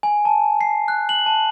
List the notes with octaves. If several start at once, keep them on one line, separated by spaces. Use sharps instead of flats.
G#5
A5
C7
F#6
F#7
A5